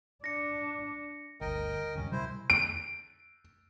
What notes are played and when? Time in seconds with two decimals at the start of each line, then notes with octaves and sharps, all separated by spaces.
0.24 D4 A#6 C#7
1.41 G1 D2 A#4 D#5 G5
1.95 D#1 C#2 G2 C#4
2.12 C3 F#3 G3 E4 C5
2.50 D7